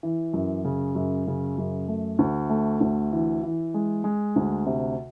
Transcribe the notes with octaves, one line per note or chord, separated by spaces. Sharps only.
E3
F#2
C#3
F#2
C#3
F#2
A3
D2
A3
D2
E3
E3
G#3
G#3
D2
C3